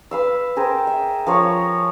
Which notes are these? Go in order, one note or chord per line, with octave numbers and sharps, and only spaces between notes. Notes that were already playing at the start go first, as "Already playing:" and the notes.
B4 F5 E6
G#4 A#4 C5 G5
E5
F3 A#4 C#5 F5